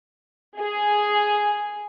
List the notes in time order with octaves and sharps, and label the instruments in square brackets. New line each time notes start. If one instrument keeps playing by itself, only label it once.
[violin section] G#4